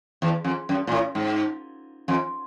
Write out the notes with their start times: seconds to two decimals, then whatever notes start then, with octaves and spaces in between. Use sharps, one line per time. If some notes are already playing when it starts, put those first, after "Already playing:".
0.22 E2
0.45 F2
0.69 F#2
0.87 A#2
0.92 A2
1.15 G#2
2.08 F2